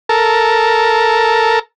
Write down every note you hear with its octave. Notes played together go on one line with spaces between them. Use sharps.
A4 A#4